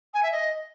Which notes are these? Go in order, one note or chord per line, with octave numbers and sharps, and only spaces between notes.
G#5
E5
D#5